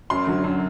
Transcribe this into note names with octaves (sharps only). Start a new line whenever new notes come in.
F#2 C6
D3 F#3
F#2